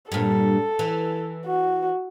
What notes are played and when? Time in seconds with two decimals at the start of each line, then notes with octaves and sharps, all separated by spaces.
0.12 G2 A#2 A4
0.79 E3
1.46 F#4